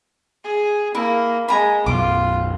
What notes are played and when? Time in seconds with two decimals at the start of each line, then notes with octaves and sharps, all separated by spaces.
0.44 G#4
0.95 A#3 E4
1.48 G#3 G#5 A#5 B5
1.86 B1 F#2 B2 F4 D6